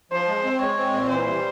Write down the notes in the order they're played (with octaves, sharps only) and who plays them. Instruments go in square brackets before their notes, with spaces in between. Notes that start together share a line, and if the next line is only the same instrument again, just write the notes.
[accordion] F3 [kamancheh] C5
[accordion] G#3
C4
[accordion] G#3 [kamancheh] C#5
[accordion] C4
A#2
[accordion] E3 [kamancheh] C5
[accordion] G3